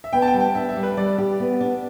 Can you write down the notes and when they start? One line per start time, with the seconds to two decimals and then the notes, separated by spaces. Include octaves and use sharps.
0.04 E5
0.13 B3 G5
0.22 A5
0.28 G5
0.34 G3
0.40 G5
0.55 D4 E5
0.69 E5
0.76 G3
0.83 B4
0.97 G3 D5
1.18 G4 D5
1.40 B3
1.61 D4